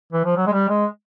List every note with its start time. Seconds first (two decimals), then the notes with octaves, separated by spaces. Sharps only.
0.13 E3
0.25 F3
0.37 F#3
0.47 G#3
0.53 G3
0.69 G#3